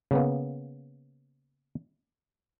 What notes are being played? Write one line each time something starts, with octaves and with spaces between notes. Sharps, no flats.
C#3 A#3 B3